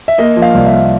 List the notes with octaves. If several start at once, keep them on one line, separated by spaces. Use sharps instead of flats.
E5
A#3 D#5
F3
F5
C2
E5
A#3